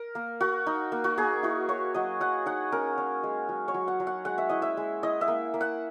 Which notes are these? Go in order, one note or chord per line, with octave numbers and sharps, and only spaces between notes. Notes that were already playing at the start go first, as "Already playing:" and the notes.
Already playing: A#4
A#3
A#3 F#4
D#4
A#3
F#4
A#3 G#4
E4 F#4
A#3 C#5
F#3 D#5
F#3 F#5
D#4 F#5
C#4 A#4
C#4
G#3
F#3
C#5
F#3
F#5
F#3
F#5
G#3 F#5
E5
E4 D#5
E5
G#3
E4 D#5
E5
A#3
A#3
F#5